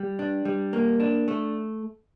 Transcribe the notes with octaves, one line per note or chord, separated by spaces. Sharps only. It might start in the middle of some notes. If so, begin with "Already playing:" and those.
Already playing: G3
D4
G3
A#3
D4
A3